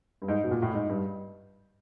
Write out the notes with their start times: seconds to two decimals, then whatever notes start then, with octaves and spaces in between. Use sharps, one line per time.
0.22 G2
0.28 G#2
0.44 B2
0.51 A#2
0.62 A2
0.74 G#2
0.89 G2